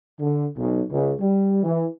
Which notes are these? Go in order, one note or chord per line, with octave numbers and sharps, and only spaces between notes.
D3
B1
C#2
G3
E3